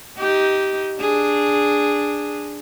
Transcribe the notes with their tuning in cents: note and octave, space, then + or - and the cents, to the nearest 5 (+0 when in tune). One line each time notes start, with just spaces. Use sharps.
D#4 +10 G4 -10
D4 +0 G#4 -5